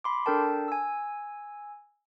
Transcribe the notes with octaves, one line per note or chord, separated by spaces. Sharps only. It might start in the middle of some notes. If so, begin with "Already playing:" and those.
B5 C6 D6
D4 A4 A#4 G5 A5
G#5 E6